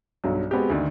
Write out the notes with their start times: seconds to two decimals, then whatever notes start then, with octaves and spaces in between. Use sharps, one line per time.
0.24 B1 G2 F#3
0.51 G#3 B3 C4 F#4 G4
0.70 D2 D3 D#3